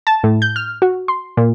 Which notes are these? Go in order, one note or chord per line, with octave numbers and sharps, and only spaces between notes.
A5
A2
G6
F6
F#4
C6
A#2